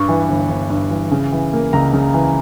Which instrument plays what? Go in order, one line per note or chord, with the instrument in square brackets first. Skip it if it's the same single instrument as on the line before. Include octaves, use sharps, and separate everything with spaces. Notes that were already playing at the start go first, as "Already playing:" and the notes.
Already playing: [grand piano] G2 C#6
E3
G1
G1
G2
E3
C#3
E3
A#3
C#2 A#5
C#3
E3